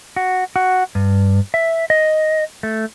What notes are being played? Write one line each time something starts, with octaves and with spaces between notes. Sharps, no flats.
F#4
F#4
G2
E5
D#5
A3